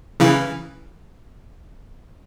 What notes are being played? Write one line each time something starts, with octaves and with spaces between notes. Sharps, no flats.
C#3 E3